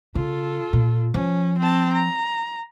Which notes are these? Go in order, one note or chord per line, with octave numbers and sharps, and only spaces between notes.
C#3 F4 A4
A#2
F3 C#4
C4 A5
A#5